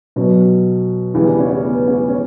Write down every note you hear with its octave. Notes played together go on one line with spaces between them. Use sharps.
B2 F#3 C#4
E2 C#3 E3 G3 E4
D4
C#4
C#4
B3
C#4
C#4